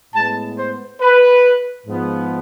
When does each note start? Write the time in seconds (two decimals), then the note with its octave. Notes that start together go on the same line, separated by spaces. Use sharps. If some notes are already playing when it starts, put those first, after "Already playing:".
0.13 A2 G#3 B3 A5
0.56 C5
1.00 B4
1.86 G#2 F3 B3